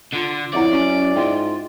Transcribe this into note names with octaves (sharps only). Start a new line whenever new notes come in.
D3 F4
F2 E4 C#5 D5 E5 F#5
F#2 C#4 F#5 C#6
G#2 D4 F4 E5 G5